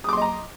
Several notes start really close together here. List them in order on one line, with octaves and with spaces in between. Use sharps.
D#6 D6 C6 D#5 A#5